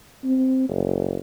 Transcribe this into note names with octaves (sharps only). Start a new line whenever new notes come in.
C4
F#1